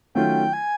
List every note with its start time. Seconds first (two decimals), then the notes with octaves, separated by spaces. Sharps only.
0.15 D#3 F#3 A3 C#4 F4 G5
0.53 G#5